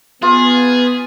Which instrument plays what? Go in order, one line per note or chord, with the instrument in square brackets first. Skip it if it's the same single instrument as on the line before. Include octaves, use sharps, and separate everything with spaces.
[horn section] B3 [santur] F4 [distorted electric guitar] G#4